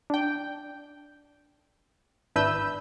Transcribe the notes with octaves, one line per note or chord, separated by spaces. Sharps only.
D4 G5
G#1 D4 E4 B4 E6 G6